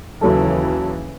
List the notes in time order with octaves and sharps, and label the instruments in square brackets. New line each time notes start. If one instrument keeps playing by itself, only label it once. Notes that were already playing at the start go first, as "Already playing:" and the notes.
[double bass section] D#2 C#3 E3 [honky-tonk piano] F#3 A4